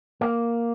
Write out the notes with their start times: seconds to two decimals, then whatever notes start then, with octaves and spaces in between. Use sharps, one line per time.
0.21 A#3